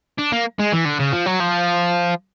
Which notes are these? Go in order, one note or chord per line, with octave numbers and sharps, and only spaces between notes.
D4
A#3
G#3
E3
D3
C#3
F3
F#3
F3